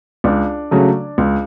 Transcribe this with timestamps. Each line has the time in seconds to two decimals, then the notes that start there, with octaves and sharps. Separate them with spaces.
0.24 C#2 D4 D5
0.71 C#3 F#3 A3
1.18 C#2